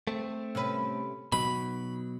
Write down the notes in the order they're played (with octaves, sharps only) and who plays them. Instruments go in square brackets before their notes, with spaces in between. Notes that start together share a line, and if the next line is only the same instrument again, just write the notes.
[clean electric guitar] A3 C4
[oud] C3 C#4 B4
[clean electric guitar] B2 F#3 [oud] D#4 [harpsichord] B5